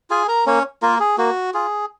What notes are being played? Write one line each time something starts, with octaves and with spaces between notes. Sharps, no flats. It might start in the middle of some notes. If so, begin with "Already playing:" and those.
F4 G#4 G#5
A#4 A#5
A#3 C#4 C#5
A#3 F4 A#4
G#4
A#3 F#4
F4 G#4